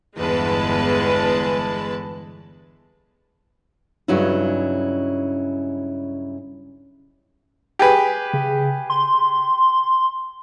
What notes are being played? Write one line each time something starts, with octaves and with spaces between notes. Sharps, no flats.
G1 E2 G#3 B4 A5
G2 C#3 F#3 C#4 D#4 E4
G4 G#4 B4
C#3
C6